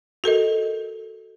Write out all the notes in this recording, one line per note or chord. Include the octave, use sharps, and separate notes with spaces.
F#4 A4 A#4 D#5